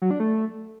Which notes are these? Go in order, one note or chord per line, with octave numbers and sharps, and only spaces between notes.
F#3
D4
A3